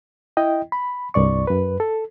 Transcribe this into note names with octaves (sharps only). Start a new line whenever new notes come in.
E4 D#5 G5
B5
C2 G2 D5 C#6
F#2 B4
A4